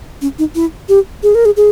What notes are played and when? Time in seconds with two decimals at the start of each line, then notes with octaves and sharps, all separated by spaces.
0.21 C#4
0.39 D#4
0.55 E4
0.89 G4
1.23 G#4
1.35 A#4
1.45 G#4
1.57 G#4